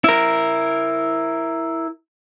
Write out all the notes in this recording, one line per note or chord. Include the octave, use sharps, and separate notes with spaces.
E4 A#4